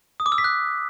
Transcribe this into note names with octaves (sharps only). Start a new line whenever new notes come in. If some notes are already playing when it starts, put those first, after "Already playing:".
D#6
D6
E6
B6
F#6